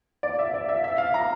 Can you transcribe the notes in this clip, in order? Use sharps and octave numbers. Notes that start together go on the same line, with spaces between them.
D5
E5
D5
E5
E5
F5
A#5